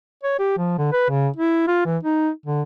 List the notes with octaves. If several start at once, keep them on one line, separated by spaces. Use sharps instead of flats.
C#5
G4
F3
D3
B4
C#3
E4
F4
E3
D#4
D3